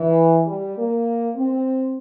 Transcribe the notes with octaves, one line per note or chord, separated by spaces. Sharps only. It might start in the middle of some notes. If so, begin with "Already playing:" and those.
Already playing: E3
G3
A#3
C4